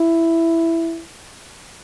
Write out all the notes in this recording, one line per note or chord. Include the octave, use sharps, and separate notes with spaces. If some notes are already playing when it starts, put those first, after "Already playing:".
Already playing: E4